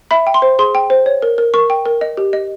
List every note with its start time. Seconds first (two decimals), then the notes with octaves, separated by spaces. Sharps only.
0.11 E5 B5
0.27 G5
0.34 C6
0.42 C5
0.59 G#4 C6
0.75 G5
0.90 C5
1.06 C#5
1.22 A#4
1.38 A#4
1.54 A#4 C#6
1.70 G5
1.85 A#4
2.01 D#5
2.17 G4
2.33 D#5